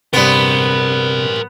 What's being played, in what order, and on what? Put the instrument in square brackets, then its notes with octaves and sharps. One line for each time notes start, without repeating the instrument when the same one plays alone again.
[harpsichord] G2 G5 [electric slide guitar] C3 [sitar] B3 [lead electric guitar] A#4 C5